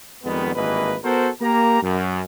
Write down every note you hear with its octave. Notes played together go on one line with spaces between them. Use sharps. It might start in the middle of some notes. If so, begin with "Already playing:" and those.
F2 D#3 G3 G#3 B3
G#1 G2 E3 A#3 B4 D#5
B3 F#4 A4 A#4 C5
A#3 G4 A#5
F#2